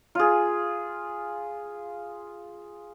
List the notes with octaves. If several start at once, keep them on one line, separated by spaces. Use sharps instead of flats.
F4 G#4